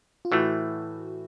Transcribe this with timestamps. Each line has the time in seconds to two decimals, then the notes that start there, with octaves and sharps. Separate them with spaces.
0.25 F4
0.31 A2 E3 A3 F#4